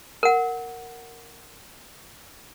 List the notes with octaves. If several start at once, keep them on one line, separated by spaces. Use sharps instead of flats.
A#4 F#5